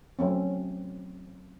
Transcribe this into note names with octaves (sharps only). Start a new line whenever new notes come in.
F#3 A3 C4 C#4